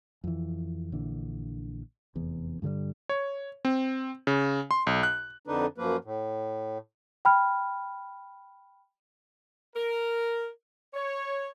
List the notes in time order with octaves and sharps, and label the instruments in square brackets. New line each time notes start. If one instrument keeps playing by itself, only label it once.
[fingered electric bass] F2 E3
A#1 D3 E3
F1 E2
G2 D3 F3 G3
[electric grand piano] C#5
C4
C#3
C6
B1
F#6
[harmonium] F2 D3 D4 D#4 B4
F#2 F3 A#3 B4
A2
[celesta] G5 B5 F6
[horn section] A#4
C#5